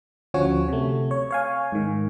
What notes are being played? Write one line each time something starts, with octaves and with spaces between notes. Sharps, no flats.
D2 F3 C#4 F#4 C#5
C3 A3
C#5
C#5 F5 G#5
G#2 D#3